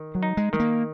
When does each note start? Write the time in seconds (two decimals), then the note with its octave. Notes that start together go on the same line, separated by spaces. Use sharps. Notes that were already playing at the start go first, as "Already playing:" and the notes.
Already playing: D#3
0.15 F#3
0.23 D#4
0.37 G#3
0.53 D#3 G#3
0.60 A#3